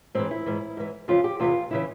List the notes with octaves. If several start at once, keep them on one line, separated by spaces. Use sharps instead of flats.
G#2 E3 C4
E4
G#2 E3
G#2 E3
F2 C#3 E3 F4
G4
E2 C3 E3 F4
C#3 E3 E4